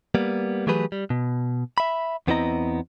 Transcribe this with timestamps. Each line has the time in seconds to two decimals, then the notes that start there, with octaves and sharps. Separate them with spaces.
0.15 G3 A#3 B3
0.67 E3 F#3 A3 G4 G#4 B4
0.92 G3
1.10 B2
1.78 E5 B5
2.27 E2 B3 C4 E4 D#5 A#5